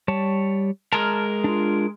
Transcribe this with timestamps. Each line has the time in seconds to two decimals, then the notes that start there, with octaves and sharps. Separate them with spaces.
0.08 G3 C#5 A5
0.93 G#3 A#4 A5 A#5 F6
1.44 D4 F4